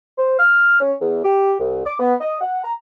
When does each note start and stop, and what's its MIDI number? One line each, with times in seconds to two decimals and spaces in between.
0.18 0.38 72
0.38 0.78 89
0.79 0.93 61
1.01 1.24 40
1.25 1.54 67
1.59 1.81 36
1.86 1.94 86
2.00 2.15 59
2.21 2.38 75
2.41 2.61 78
2.64 2.73 82